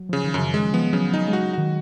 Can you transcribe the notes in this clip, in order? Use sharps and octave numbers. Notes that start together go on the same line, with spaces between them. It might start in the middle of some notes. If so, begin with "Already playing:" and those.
Already playing: F#3
C#3 F3
D#3
F#2 C#3
D#3 G#3
F3 B3
C#3 F#3
F#3 D#4
G#3
F#4
D#3 F#4